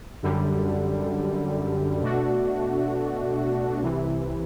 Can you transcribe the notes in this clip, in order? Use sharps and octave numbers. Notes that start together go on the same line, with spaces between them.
F#2 D3 G3
B2 A3 D4 F#4
C2 C3 E3